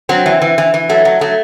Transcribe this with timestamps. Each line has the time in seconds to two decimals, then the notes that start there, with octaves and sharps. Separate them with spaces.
0.09 F#3 C4
0.26 E3
0.41 E3
0.58 E3
0.74 E3
0.89 F#3 A3
1.05 F#3
1.21 F#3 A3